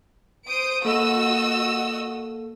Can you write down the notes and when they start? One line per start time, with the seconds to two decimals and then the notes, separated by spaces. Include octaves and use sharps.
0.47 C5 D#6 D7
0.85 A#3 F#4 A4 D#5 E6